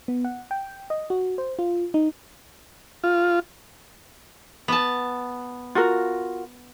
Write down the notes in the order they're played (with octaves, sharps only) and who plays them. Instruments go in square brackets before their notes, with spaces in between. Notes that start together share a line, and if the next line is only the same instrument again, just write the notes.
[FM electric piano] B3
F#5
G5
D#5
F#4
C5
F4
D#4
[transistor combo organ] F4
[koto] B3 A5
[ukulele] F4 F#4 A#4